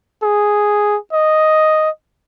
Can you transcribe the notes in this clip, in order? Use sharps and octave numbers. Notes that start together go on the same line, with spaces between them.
G#4
D#5